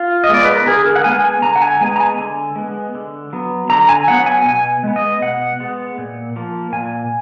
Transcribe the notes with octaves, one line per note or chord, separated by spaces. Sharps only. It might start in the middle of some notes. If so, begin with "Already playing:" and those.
Already playing: F4
D#5
G#3 B3 D5
B4
A#4
D3 G#4
A#4
F#5
G#3 B3 G#5
G#5
D3 A#5
F#5
G#5
G#3 B3 G#5
A#5
G#5
D3
G#3 B3
D3
F#3 B3
D3 A#5
G#5
F#3 B3 F#5
G#5
B2 G#5
G#3 B3
D#5
B2 F#5
G#3 B3
A#2
F3 A#3
A#2 G#5